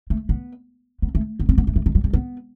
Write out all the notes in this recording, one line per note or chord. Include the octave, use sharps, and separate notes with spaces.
A3
B3
B3
A3
B3
C4
B3
A3
E3
D#3
F#3
G3
B3